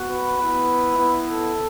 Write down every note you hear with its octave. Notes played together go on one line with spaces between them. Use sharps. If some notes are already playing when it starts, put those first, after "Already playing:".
Already playing: B3 F#4
B4
B3 E4
B3 E4
A4